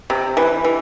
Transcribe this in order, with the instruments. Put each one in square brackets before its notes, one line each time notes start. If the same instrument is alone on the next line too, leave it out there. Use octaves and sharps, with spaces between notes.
[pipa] C3
E3
E3